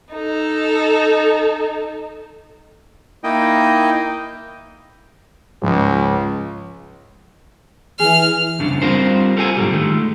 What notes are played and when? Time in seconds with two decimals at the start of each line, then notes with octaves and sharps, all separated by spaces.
0.13 D#4 A4
3.24 A#3 D#4 E4 D#5 G5
5.62 C#2 G#2 F3 G#3
8.00 E3 G#4 F6
8.59 C2 F#2 C#3 D4
8.82 G3 C4 F4 A#4 C5
9.37 F4 A4 C5 E5 G#5
9.57 G#2 B2 D3 D#3 F#3 G3
9.72 D#3 G#3 A3